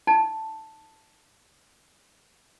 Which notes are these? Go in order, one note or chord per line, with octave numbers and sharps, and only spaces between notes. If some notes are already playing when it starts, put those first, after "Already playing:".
D#4 A5